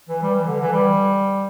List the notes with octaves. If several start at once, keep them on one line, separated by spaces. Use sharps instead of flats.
E3
G3
E3
D3
E3
G3